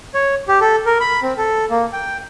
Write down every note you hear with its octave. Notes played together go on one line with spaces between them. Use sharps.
C#5
G4
A4
A#4
B5
C4
A4
A#3
G5